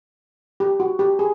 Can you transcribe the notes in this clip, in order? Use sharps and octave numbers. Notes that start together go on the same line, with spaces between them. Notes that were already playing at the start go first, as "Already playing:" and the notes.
G4
F#4
G4
G#4